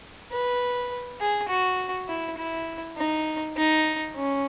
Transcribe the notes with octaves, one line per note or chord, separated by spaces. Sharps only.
B4
G#4
F#4
E4
E4
D#4
D#4
C#4